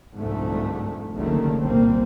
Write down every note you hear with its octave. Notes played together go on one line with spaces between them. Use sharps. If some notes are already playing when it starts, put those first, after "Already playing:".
C2 F2 G#2 D3 A3
F#1 C#2 D3 D#3 A3
C2 A#2 G3 A#3 C4